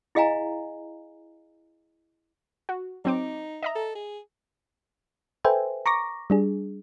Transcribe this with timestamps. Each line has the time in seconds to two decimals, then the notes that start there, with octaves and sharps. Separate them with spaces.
0.15 E4 G#4 D#5 F5 G#5 A#5
2.69 F#4
3.05 F#3 C4 D#4 D6
3.63 D#5 E5 A#5
3.76 A4
3.95 G#4
5.44 A4 B4 C5 E5 G5 G#5
5.86 A#5 C#6 D6 A#6
6.30 G3 D4 G#4